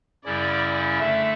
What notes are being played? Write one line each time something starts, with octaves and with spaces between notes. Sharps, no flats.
F#2 C#3 G3 C#4 E4 D5
D3 A3 D4 E5